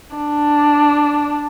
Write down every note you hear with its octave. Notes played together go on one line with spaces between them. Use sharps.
D4